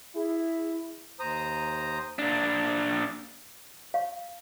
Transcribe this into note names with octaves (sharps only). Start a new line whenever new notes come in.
E4 G#4
D#2 C5 A#5 D#6
A#2 D4
F5